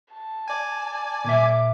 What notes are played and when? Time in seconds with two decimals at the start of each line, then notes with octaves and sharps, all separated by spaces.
0.11 A5
0.48 D5 G#5
1.24 A#2 E5 D6